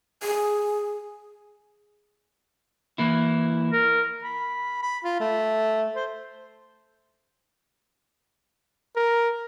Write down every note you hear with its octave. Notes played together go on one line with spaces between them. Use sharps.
G#4
E3 A#3 E4
A#4
B5
B5
F4
A3
C5
A#4